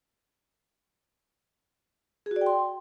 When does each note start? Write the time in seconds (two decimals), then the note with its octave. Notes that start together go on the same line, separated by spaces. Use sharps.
2.26 G#4
2.31 F#4
2.36 D5
2.41 G5
2.46 C6